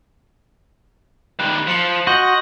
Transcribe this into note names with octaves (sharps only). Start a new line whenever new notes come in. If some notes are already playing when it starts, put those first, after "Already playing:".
D#3 G3 F#6
F3 B6 C#7 F#7
F#4 D#5 C6 G6